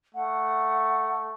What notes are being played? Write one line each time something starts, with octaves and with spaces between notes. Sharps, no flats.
A3 F#5